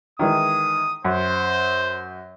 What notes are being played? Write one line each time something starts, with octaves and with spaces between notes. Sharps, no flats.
D#3 E3 G#3 D#6
F#2 C5